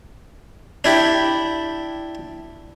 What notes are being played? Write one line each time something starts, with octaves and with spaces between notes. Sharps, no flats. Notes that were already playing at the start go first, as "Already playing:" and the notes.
D4 E4 G4